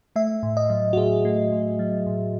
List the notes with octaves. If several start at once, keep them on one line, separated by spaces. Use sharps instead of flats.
A3 E5
A2
D#5
F#3
F#4
A2 G#4
A3
A2
F#3
A2